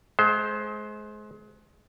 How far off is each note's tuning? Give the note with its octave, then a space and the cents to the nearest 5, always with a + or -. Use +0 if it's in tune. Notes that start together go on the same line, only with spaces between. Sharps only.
G#3 +30 C5 +0